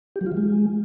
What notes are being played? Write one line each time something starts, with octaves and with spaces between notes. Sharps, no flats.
G4
F#3
F4
E3
G#3